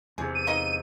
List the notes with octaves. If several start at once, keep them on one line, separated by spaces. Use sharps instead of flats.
E2 C3 G#4
D#7
A#3 D#4 D#5